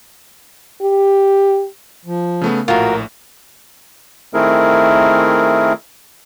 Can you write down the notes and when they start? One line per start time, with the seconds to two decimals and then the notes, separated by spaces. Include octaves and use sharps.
0.82 G4
2.05 F3
2.41 C#3 A3 B3
2.68 A#1 A2 F4 F#4 A#4
4.34 D#3 A3 C4 E4 G#4 A#4